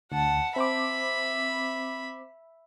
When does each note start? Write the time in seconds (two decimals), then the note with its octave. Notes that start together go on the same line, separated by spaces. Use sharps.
0.12 D2 F#5 A5
0.56 C4 C5 E5 B5 D6